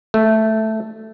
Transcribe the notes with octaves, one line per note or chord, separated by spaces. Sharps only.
A3